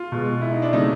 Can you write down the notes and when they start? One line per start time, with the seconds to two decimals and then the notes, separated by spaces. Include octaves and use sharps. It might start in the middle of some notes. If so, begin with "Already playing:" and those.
Already playing: F4
0.12 B2 G#3
0.41 E4
0.53 D#4
0.62 D4
0.73 C#3 F#3 A3 D#4